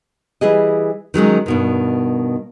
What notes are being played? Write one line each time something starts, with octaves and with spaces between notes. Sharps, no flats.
E3 G3 G#4 D#5
D#3 F#3 G#3 C#4
G2 B2 D#3